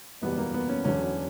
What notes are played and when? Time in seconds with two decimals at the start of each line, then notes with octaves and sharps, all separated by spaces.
0.22 F#1 E2 B2 G3 B3
0.38 A#3
0.54 B3
0.69 C#4
0.84 E1 E2 D3 F#3 C#4